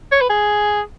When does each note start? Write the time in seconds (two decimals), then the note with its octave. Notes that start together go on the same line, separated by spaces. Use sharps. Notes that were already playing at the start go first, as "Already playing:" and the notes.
0.12 C#5
0.21 B4
0.30 G#4